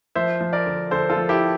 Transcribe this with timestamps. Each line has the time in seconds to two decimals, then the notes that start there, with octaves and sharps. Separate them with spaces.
0.15 F3 C5 E5
0.41 F3
0.53 A#4 D5
0.66 D2
0.91 D2 A4 C5
1.10 F4 A4
1.16 F3
1.29 E4 G4